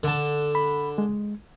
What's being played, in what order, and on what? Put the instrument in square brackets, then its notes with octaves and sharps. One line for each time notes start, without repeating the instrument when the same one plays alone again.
[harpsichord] D3 A5
[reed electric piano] B5
G#3